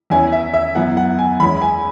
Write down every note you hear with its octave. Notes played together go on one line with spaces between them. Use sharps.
E2 E3 C#4 E4 G#5
E5
E5
F#2 E3 B3 E4 F#5
F#5
G#5
E2 E3 G#3 C#4 B5
G#5